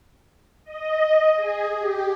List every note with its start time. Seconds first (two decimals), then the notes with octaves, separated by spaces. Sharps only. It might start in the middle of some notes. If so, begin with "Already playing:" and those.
0.64 D#5
1.34 G#4
1.78 G4